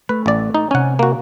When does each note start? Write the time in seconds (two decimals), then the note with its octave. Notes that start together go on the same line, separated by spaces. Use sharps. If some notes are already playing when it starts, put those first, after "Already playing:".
0.09 A3 B4
0.26 A1 D5
0.55 D#4
0.71 C3 C#4 F#5 G#5
0.99 A#3 F#4